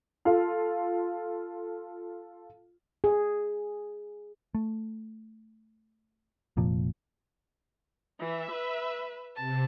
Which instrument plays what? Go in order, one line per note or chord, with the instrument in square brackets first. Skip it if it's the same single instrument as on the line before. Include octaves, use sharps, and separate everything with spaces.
[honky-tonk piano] F4 A4 F5
[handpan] G#4
[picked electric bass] A3
F1 A#2 F3
[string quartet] E3 [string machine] E5
[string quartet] B4
[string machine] C3 [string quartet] A5